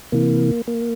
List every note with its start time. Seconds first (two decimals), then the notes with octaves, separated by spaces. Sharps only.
0.12 C3 E3 A#3
0.68 A#3